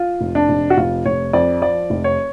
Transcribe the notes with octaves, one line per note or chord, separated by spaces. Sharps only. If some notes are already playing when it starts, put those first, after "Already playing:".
Already playing: F4
F1
D4
F1
F#4
F1 F4
F1 C#5
F2 D5
F3 D5
F1
C#5